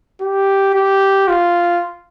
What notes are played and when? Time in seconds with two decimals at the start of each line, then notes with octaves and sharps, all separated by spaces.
0.21 G4
0.74 G4
1.28 F4